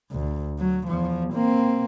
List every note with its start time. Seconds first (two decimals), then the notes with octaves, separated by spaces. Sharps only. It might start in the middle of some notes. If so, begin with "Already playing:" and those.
0.12 D2
0.59 F#3
0.87 E2 F3
1.34 A#3 C4